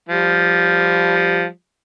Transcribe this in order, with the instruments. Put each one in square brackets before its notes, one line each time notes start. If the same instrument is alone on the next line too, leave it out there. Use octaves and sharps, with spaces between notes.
[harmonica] F3 G3